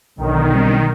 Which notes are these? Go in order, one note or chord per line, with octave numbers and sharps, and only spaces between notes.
B1 D3 D#3
G3 C4 D4